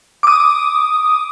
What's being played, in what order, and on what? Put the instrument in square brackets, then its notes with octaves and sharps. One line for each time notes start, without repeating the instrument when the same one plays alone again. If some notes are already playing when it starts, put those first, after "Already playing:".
[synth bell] D6 D#6